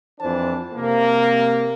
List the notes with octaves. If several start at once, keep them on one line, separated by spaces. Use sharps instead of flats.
F2 E3 D4 C5 A5
C3 A#3